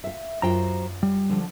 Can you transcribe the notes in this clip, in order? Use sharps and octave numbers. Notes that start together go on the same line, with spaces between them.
E5 F5
F#2 F#3 F4 C5 G5 A#5
G3
D3 F3 D4